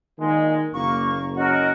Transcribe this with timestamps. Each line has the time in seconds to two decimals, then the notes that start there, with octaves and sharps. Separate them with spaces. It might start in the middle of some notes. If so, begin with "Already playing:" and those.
0.19 A#2 D#3 G#3
0.74 F#1 A#3 C#6
1.37 F#3 C#4 F#4 A#4 D#5